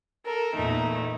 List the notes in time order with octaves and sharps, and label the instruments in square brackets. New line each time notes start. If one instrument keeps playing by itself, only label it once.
[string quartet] A4 A#4
E2 A#2 A3 D#4